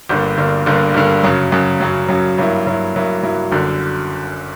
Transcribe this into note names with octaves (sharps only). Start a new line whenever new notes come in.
G1 G2 D3 A#3
G1 G2 D3 A#3
G1 G2 D3 A#3
G1 G2 D3 A#3
F#2 C#3 F#3
F#2 C#3 F#3
F#2 C#3 F#3
F#2 C#3 F#3
G2 F#3 A#3 E4
G2 F#3 A#3 E4
G2 F#3 A#3 E4
G2 F#3 A#3 E4
G1 F#2 D3